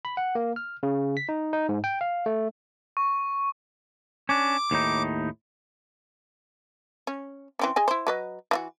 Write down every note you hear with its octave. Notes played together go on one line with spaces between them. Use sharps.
B5
F#5
A#3
F6
C#3
B6
D#4
D#4
G#2
G5
F5
A3
C#6
C#4 D4 D6
D#2 A2 D#4
C#4
E3 C4 C#4
G#4 D#5 G#5
E4 C5
F#3 B4 D#5
E3 F4 F#4